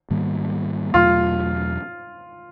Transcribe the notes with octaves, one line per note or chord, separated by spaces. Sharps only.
G#2 D#3 G3 A#3
E2 B2 F#3 A3 F4